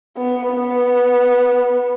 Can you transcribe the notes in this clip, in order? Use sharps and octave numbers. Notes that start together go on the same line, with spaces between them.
B3
B3